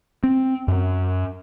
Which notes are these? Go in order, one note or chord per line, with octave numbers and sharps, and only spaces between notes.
C4
F#2